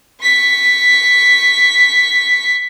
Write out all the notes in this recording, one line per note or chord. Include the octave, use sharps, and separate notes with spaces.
C#6 B6